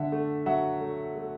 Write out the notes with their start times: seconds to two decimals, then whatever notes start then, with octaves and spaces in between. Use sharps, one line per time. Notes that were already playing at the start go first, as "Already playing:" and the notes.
Already playing: D3 E5 F#5
0.12 A3
0.46 F#3 E5 F#5
0.81 A3
1.16 A3